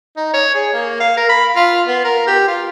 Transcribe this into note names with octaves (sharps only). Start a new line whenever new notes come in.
D#4
C#5
G#4
A#3
F5
A#4
B5
F4
B3
A#4
G4
F4